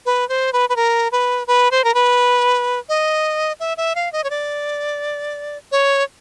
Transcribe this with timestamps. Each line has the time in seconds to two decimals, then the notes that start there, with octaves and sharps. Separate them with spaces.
0.06 B4
0.29 C5
0.53 B4
0.69 B4
0.76 A#4
1.12 B4
1.47 B4
1.71 C5
1.84 A#4
1.94 B4
2.89 D#5
3.60 E5
3.77 E5
3.95 F5
4.13 D#5
4.24 C#5
4.30 D5
5.72 C#5